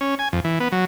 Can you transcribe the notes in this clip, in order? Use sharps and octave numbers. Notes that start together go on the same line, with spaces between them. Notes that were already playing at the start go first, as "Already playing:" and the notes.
C#4
G#5
F2
E3
B3
F#3